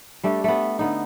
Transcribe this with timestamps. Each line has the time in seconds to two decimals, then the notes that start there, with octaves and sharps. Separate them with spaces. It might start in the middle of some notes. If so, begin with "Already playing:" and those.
0.23 G3 A3 D4 G4
0.44 A3 B3
0.79 D3 B3 D#4